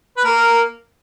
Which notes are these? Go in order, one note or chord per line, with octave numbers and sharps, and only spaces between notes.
B4
A#3 A#4